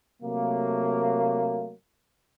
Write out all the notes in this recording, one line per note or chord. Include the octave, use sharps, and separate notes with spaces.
C3 F#3 A3 A#3